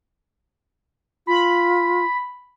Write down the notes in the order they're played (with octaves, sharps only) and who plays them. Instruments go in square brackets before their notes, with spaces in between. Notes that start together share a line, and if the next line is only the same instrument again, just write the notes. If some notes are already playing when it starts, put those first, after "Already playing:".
[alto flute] F4 [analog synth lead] B5